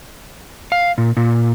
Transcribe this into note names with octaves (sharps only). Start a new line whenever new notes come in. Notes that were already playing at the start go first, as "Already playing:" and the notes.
F5
A#2
A#2